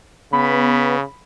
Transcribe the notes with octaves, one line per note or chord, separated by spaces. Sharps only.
C#3 B3 B5